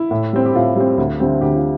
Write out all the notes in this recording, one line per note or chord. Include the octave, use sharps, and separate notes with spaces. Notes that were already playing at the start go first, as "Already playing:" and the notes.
Already playing: E4
A2
G3 C4
G4
A2 F4
G3 C4
D2
D3 G3 C4
D2 G4
F4